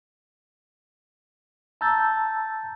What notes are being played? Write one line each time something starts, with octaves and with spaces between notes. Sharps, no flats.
A5 A#5 E6 G6 A6